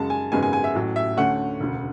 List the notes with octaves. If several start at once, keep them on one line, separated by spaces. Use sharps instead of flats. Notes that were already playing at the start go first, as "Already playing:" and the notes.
Already playing: F#2 C#3 G#3 A5
G#5
G#1 F#2 C#3 G#3 B3 G#5
G#5
G#5
E5
A1 A2 F#3
E5
D2 D3 A3 C#4 F#5
E1 D2 C#3